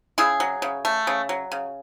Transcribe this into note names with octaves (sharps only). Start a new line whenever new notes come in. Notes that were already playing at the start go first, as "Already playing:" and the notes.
C#3 E4 G#4
F#3
C#3
A3
C#3
F#3
C#3